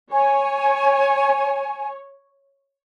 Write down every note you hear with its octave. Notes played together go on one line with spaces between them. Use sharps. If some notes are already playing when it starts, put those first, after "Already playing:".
C#5 G#5